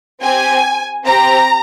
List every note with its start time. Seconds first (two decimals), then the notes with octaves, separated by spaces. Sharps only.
0.22 C4 G4 G#5
1.05 C4 G4 A#5